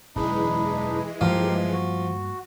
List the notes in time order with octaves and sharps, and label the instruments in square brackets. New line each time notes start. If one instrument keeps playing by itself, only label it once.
[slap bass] E1 F#2 D3 [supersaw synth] E3 G#3 [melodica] D4 D#4 B4
[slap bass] G2 A3 A#3 [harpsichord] F3 [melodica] G4 A#4 F5
[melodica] F#4